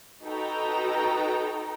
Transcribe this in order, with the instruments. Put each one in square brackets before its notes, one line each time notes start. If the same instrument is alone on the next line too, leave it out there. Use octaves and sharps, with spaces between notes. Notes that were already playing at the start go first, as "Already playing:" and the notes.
[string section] D#4 F#4 A4 B4 G5 A#5